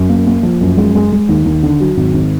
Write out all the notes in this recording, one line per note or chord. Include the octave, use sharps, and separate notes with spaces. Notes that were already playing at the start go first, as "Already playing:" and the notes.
Already playing: F#2
A#3
A#3
F3
F#2
G#3
G#3
G#3
D#2
D#2
D3
F#3
G#1
G#1